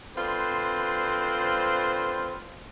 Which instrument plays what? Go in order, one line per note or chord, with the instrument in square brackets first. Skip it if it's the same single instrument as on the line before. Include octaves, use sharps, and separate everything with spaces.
[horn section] D3 C4 F4 B4 C5